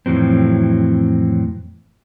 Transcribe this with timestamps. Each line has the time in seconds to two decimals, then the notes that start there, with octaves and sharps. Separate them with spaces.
0.06 F2 A2 E3 F#3 C4